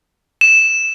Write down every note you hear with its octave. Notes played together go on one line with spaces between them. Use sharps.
E7